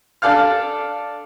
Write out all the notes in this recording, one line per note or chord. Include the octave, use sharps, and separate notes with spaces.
D4 A4 D5 F5 F6